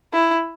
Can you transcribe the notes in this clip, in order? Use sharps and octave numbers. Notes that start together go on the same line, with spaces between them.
E4